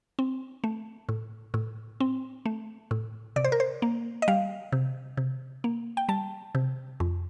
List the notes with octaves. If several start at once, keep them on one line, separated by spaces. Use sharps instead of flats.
C4
A3
A2
A2
C4
A3
A2
C3 D5
C5
A#4
C5
A#3
D#5
G3 F5
C3
C3
A#3
G5
G3 A5
C3
F2